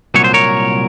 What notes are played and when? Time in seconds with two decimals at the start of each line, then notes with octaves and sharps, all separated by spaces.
0.14 C2 A#2 F#3 C#5
0.24 C5
0.34 A#4 C#5